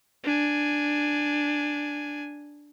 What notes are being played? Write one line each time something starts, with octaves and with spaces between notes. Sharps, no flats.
D4 G#5